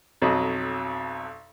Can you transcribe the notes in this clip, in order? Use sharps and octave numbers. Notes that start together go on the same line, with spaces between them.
B1 F2 F#3 D#5